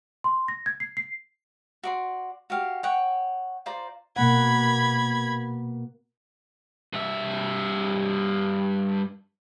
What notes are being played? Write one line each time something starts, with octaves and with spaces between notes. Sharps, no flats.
C6
A#6
G#6
C7
C7
F#4 D5 C6
F#4 G4 F5
C#5 F#5 G5
F4 C5 D5 A#5
B2 A#3 F#5 B5 G#6
G2 E5